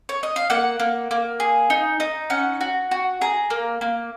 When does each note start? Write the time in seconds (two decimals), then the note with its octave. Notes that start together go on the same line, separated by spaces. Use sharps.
0.09 C#5
0.23 D#5
0.36 F5
0.50 A#3 F#5
0.79 A#3
1.11 A#3
1.40 G#4
1.70 D#4
2.00 D#4
2.30 C#4 F#5
2.61 F#4
2.91 F#4
3.21 G#4 A#5
3.50 A#3
3.81 A#3